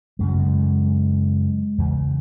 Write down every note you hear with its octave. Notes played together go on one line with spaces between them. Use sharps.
F#2 C#3 G#3
F#3
G#3
E2 C#3